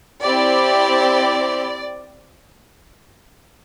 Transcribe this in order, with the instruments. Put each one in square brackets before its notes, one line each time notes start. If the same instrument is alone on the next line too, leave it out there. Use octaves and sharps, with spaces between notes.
[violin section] C4 E4 G4 D5